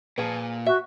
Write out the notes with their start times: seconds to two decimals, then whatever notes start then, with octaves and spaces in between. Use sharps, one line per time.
0.18 A#2 F3 G#4 B4
0.66 F#4 E5